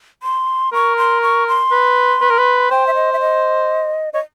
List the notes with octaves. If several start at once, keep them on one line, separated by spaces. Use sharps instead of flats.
C6
A#4 C#6
C6
C#6
C6
B4
B4
A#4
B4
C5 G5
E5
D#5
E5
D#5
C#5 D#5